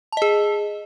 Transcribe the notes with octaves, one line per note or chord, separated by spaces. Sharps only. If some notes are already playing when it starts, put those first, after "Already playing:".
G#4 D#5 A5